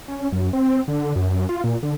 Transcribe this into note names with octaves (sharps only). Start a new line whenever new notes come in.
C#4
F#2
C4
D3
F#2
F4
A#2
D3